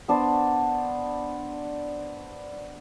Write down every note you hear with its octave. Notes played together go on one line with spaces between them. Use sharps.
B3 D4 C5 D5